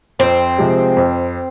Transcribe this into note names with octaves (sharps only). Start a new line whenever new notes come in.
F2 C4
C3 F3 G#3
F2